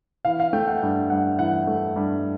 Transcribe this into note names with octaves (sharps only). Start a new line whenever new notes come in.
E3 F5
F5
A3 G5
F#5
G2
G2 F#5
E3 F#5
A3
G2